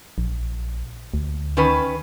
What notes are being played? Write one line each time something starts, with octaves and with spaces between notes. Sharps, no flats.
A#1
D2
D#3 C#4 B4